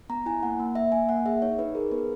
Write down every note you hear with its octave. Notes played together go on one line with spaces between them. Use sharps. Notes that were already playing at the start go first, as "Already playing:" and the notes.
B3 A#5
E4 G#5
A#3 F#5
A#3
A#3 E5
A#3 G#5
A#3 F#5
G#4 E5
D#4 C#5
D#4 B4
G#4 A#4
B3 B4